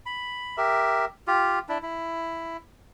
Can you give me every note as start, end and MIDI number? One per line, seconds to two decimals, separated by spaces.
0.06 0.56 83
0.57 1.05 67
0.57 1.05 70
0.57 1.05 76
1.27 1.59 65
1.27 1.59 67
1.69 1.78 62
1.69 1.78 64
1.83 2.57 64